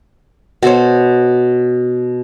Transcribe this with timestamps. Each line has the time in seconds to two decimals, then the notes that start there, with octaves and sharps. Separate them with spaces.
0.63 B2 A4 C5 C#5